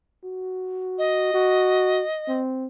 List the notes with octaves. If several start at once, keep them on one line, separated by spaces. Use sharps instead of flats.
F#4
D#5
F#4
C4